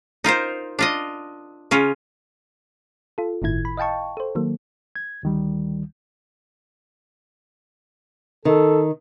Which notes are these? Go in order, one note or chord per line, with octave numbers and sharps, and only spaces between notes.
D#4 F4 A#4 C5
D4 F4 D#5
C#3 C#4 F4
F4 A4
G1 A2 D#3 E4 G#6
B5
D#5 F5 G5 A5 C#6
A4 C5
D#3 F#3 A#3
G#6
D2 D#3 G3
D#3 A4